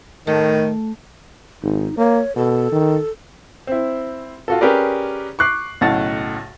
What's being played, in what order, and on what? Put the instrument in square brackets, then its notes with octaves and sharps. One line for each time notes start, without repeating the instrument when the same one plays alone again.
[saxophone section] A2 D#3 [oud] A3
[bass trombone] G#1 [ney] D#4
[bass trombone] A#3 [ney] C#5
[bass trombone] B2 [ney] A4
[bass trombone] D#3
[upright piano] C4 E4
F4 F#4 A4
C#4 G4 G#4 A#4 B4 D5
C#6 D6 F#6 C7
B1 A2 C#3 F#5 A5 A6